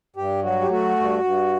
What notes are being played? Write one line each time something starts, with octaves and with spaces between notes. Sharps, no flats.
G2 G4
F#3 F#4
G4
A3 F#4
G2
G2